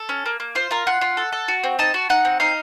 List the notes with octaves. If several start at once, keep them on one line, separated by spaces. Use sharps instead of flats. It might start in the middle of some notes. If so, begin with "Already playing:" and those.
Already playing: A4
C#4
A#3
A#3
F4 C5
F4 A#4
F4 F#5
F4
A4
A4
F#4
C4
D#4 A5
F#4
D#4 F#5
C4
D#4 F5